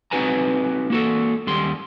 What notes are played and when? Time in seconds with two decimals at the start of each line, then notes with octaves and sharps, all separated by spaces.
0.11 C4 D#4 F#4 B4 G#5 A#5
0.90 A#3 F#4 A4
1.47 D#2 G3 C6